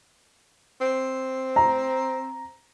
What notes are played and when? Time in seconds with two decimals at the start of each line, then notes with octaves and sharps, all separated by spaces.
0.81 C4
1.56 A#5